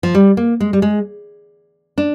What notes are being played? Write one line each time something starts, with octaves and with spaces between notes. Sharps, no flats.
F3
G3
A#3
G#3
G3
G#3
D4